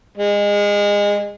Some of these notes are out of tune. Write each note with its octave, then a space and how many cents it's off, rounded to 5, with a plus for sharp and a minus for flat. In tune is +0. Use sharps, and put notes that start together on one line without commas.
G#3 -25